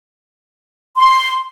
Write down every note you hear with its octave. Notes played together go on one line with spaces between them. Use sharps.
C6